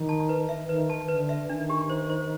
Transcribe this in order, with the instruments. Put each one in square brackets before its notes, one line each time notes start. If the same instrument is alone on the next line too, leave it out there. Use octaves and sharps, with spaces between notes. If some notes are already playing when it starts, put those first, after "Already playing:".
Already playing: [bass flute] D#3
[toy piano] A5
B4
E5
[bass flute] D#3 [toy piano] B4
[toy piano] A5
[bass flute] D3 [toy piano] B4
[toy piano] E5
[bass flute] D#3 [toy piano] D4
[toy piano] G4
C5
C5